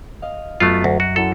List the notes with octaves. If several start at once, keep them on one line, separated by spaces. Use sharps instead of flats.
D#5 F5
F#2 A3 B3 F4
D2
F#4
F#2 E4 A4